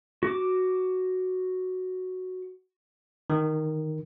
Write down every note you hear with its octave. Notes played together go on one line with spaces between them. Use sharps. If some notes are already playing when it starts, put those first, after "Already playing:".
F#4 D6
D#3